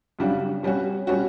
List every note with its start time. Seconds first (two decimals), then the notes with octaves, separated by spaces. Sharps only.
0.19 F#2 C#3 G3 D4 F#4
0.63 B2 G3 C#4 F#4
1.07 B2 G3 C#4 F#4